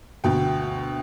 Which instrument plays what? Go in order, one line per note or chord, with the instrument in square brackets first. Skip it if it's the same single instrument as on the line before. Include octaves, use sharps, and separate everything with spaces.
[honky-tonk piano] D2 B2 G5